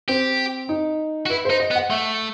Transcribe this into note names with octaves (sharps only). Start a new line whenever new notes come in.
C4 G4
D#4
F#4
E4 B4
D#4 C5
D#5
B3
F#5
A3 E5